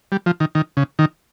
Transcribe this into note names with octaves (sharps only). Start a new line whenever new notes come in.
G3
F3
D#3
D#3
C#3
D#3